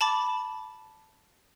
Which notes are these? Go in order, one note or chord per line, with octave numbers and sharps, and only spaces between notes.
A5 B5 D6 A6